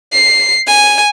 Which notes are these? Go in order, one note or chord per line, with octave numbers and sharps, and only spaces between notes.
C7
G#5